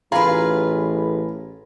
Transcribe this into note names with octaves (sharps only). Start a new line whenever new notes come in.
A1 F4 G#4 B4 A#5 B5